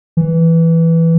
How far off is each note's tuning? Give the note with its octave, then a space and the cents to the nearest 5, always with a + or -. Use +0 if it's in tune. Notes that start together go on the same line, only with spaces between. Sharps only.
E3 +0